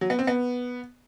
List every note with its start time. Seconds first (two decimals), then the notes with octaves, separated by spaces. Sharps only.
0.01 F#3
0.10 B3
0.19 C4
0.27 B3